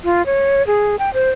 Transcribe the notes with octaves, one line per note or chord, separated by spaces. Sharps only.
F4
C#5
G#4
G5
C5